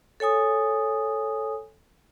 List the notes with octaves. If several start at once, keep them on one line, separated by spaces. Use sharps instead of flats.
A4 C#5 G#5 D#6